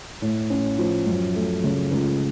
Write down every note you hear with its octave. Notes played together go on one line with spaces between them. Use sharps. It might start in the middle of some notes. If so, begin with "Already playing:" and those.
A2
C#4
F3
F#2
A3
C#3
C#2